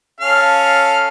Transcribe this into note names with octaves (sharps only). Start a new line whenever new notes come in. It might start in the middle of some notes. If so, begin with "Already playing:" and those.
C#4 A4 F5